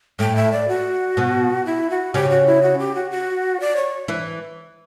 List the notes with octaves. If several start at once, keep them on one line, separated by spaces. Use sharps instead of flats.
A2 A3 G5
E5
D5
F#4
B2 B3
E4
F#4
C#3 C#4 G4
F#4
E4
F#4
G4
F#4
F#4
D5
C#5
E3 E4